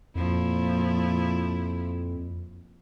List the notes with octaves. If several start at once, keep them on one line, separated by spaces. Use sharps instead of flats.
F2 A#2 F3 E4